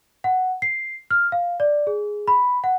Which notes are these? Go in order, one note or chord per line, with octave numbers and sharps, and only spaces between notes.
F#5
C7
F6
F5
D5
G#4
B5
F#5